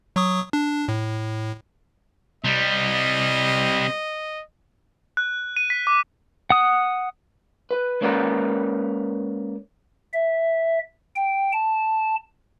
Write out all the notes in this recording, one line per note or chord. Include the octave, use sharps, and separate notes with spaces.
F#3 C#6 D#6
D4
A2
C3 G3 D#5
F#6
D#7
B6
D6
F#5 D#6
B4
G#3 A#3 C#4 A#4 B4 D5
E5
G5
A5